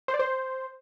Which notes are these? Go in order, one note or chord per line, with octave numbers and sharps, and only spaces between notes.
C5
D5
C5